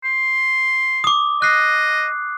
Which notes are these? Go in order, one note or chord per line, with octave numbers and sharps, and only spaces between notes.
C6
D6 D#6
D#5 F#6 C7